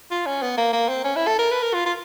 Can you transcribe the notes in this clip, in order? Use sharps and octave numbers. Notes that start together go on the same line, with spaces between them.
F4
C#4
B3
A#3
A#3
C4
C#4
E4
A4
A#4
B4
A#4
F4
F4